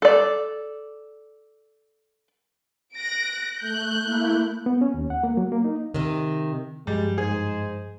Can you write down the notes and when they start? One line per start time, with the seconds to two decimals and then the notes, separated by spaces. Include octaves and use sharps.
0.02 A4 D5
2.94 F#6 A#6 D7
3.60 A3 F#6 G6
4.01 A3 A#3 E4
4.66 B3
4.81 C#4
4.94 D#2
5.10 F#5
5.23 A#3
5.37 F#3
5.52 A#3
5.64 D#4
5.94 C3 D#3
6.87 G2 F3 G3 G#3
7.18 G#2 D#4 G#4 C5